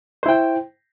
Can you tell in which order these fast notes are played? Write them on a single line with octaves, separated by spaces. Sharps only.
C5 E4 G5